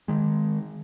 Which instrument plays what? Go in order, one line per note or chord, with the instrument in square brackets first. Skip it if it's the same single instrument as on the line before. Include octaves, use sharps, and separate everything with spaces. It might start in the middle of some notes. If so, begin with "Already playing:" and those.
[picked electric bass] D#3 G#3